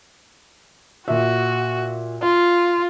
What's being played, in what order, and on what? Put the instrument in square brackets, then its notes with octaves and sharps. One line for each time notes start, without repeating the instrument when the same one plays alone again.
[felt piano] A#2 E5 [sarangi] F#4
[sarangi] F4 [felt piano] F5